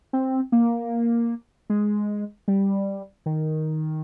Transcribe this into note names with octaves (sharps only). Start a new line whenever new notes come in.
C4
A#3
G#3
G3
D#3